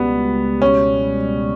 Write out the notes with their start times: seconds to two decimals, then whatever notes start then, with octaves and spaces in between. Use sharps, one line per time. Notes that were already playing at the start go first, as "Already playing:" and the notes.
Already playing: C#2 B2 G3 B3
0.62 C#4